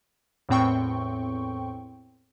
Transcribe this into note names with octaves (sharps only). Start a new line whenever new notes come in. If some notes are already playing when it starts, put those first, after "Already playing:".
E2 A2 C4 G5 C#6